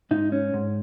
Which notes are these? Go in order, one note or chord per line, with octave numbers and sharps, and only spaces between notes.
G#2 D#4
C#4
G#2